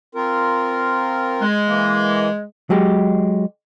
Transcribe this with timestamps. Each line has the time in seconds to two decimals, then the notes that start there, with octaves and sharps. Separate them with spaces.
0.15 C4 F4 A#4
1.42 G#3
1.67 E3 A#3
2.70 F#3 G#3 G4